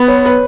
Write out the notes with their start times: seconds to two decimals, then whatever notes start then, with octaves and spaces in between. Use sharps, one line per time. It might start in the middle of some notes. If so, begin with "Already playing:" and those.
Already playing: B3 B4
0.08 C#5
0.26 B4